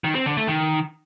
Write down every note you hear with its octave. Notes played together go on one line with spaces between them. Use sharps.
D#3
C4
D3
A3
D#3